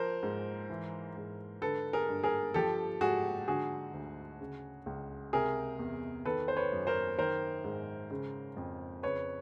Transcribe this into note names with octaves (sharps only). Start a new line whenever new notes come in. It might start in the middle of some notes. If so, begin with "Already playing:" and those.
Already playing: F3 A#4 C5
G#2
E3
G#2
D3 A4 B4
G#4 A#4
G2
G#4 A#4
F3 G4 A4
G#2 F#4 G#4
D3 F#4 G#4
D2
C#3
C#2
C3 G#4 A#4
E2
D#3 A4 B4
C5
B4 C#5
F#2
A#4 C5
D#3 A#4 C5
G#2
C#3
F2
C#3 B4 C#5